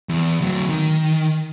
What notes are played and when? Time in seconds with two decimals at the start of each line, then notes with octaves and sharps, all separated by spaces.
0.09 E2
0.41 D2 F#3
0.69 D#3